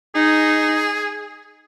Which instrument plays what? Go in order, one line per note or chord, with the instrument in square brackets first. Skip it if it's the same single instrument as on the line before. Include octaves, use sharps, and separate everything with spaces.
[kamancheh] D#4 [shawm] G#4